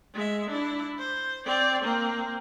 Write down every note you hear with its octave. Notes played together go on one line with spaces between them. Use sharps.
G#3 E5
D4 E4
C5
C4 D5
A#3 C4